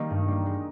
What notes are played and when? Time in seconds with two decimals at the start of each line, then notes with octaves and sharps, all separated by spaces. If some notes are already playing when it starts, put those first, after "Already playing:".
Already playing: D#3 G3 A#3 D#4
0.10 G2
0.28 G3 A#3
0.46 G#3